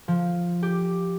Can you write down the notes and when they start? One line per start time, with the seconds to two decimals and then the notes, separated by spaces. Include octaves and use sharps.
0.08 F3
0.63 G4